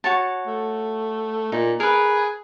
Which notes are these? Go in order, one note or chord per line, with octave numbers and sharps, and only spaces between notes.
F#4 C#5 A5
A3
A#2 D#4
G#4 A#4 B4